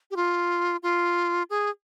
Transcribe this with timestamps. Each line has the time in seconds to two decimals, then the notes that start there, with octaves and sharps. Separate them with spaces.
0.11 G4
0.16 F4
0.83 F4
1.50 G#4